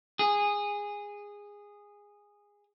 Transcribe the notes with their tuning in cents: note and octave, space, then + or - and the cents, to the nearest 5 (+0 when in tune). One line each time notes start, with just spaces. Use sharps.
G#4 -15